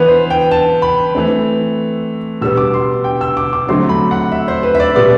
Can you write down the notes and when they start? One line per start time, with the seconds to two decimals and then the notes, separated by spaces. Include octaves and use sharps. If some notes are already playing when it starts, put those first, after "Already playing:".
Already playing: E3 B3 B4
0.08 C5
0.30 G5
0.51 A5
0.82 B5
1.15 E3 A3 C4
2.41 B2 G3 B3 E6
2.57 D6
2.74 C6
3.04 G5
3.21 E6
3.37 D6
3.53 D6
3.69 D3 F#3 A3 C4 C6
3.89 B5
4.11 F#5
4.32 E5
4.48 C5
4.63 B4
4.75 E5
4.80 D5
4.95 B2 G3 B3 D5